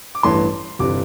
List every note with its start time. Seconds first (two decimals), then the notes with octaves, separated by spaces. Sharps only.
0.15 D6
0.23 A1 G2 E3 A3 C6
0.79 G1 C3 E3 G3 D6